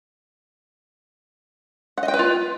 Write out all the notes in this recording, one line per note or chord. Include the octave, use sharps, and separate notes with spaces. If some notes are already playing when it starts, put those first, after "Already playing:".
F#5
D#5
G5
B4
F4